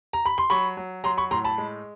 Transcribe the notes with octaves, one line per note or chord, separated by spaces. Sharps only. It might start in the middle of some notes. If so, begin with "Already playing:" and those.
A#5
B5
C6
F#3 B5 C#6
F#3
F#3 A#5 C6
B5 C#6
A2 A#5 C6
A5 B5
G#3